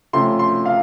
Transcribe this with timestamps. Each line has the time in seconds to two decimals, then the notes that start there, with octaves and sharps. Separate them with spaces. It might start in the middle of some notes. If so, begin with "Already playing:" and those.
0.13 C3 F3 A3 C#4 C6
0.39 C6
0.66 F5